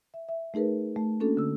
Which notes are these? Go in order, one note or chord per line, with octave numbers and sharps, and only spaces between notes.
E5
E5
A3 D#4 G#4 A#4 B4
A3
A#3 C#4 D4 F#4 A4
D3 E6